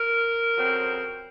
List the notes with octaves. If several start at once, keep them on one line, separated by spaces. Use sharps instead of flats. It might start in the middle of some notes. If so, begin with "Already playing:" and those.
Already playing: A#4
F2 C#3 F#3 C4